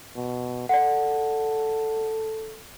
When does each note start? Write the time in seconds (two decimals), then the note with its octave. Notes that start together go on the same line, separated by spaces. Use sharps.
0.16 B2
0.69 A4 D5 F#5